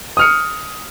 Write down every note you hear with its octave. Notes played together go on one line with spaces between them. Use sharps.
D#6 F6 C#7